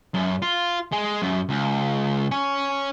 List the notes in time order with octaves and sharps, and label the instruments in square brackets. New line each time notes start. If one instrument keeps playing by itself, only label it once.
[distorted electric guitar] F#2
F4
G#3
F#2
C#2
C#4